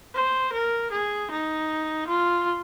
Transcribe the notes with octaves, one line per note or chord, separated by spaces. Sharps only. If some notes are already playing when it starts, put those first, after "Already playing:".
C5
A#4
G#4
D#4
F4